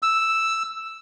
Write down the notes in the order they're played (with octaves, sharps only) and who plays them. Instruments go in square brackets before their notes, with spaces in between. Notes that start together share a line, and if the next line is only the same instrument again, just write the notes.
[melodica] E6